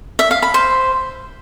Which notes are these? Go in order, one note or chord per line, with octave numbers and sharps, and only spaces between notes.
E5
F5
B5
C5